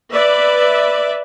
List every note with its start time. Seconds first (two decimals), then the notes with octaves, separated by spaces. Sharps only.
0.12 B4 D5 E5